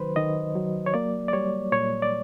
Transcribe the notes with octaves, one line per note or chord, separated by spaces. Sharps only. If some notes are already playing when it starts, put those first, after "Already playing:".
Already playing: D#3 F#3 B4 C5
D#3 D#5
F#3
C#5
A#3 D5
D5
G3 C#5
A#2 C#5
D5